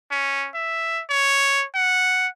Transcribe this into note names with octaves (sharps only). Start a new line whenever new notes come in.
C#4
E5
C#5
F#5